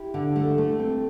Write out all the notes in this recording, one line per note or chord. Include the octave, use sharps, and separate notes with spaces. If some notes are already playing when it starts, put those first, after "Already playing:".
Already playing: E4 G4
D3
A3
A3
C4